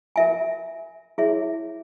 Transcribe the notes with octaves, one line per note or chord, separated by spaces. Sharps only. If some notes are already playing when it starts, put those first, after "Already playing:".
A#4 E5 G#5
E4 G#4 C#5 E5